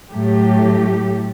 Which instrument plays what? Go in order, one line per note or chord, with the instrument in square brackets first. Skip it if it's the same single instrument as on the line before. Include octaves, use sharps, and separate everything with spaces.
[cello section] A2 F#3 A3 G4